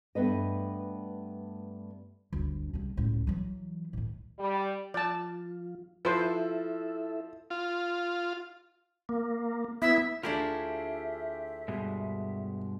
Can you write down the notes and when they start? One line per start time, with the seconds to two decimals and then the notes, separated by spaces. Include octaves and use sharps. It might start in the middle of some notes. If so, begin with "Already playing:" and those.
0.15 G2 A3 B3 B4 D#5
2.33 G1 D2
2.74 C2 C#3
2.97 C#2 A2
3.27 E3 F#3
3.93 A2 D#3
4.38 G3
4.94 F3 F4 D5 A5
6.05 F3 E4 A4 B4 C5 E5
7.50 F4
9.09 A#3
9.82 B3 E4 E5
10.23 D2 D4 E4 F4 G4 G#4 A#4 E5
11.68 G2 B2 G#3